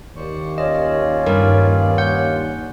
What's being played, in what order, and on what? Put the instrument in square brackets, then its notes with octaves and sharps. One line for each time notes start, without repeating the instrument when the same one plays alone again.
[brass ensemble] D#2 [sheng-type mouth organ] C5 D5 C#6
[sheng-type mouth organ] C#4 F4 D5 [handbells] D#5
[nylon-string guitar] G2 [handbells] A#4
[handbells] F#5 G6